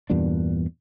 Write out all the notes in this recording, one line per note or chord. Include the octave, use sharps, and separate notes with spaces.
E2 G2 A#2 D4